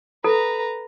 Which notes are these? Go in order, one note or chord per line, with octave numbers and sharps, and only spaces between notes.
A4 B4 A#5